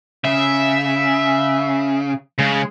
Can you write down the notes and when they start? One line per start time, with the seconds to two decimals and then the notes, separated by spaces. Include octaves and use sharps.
0.25 C#3 E5
2.39 C#3 G#3